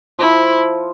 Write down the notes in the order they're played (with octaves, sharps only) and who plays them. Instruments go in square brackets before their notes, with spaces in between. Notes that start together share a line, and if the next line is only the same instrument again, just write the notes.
[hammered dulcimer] F3 [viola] E4